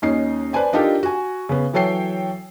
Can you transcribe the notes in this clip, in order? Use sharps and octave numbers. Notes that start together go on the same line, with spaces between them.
D#2 C#4 D#4 C7
B4 C5 D5 G#5 A5
D4 D#4 F4 G4 A4 A#4
F#4 G#5
C#3 B3
E3 F#3 A4 C#5 G5 C7